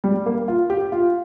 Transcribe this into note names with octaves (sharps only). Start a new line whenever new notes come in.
G3
A#3
F4
G4
F4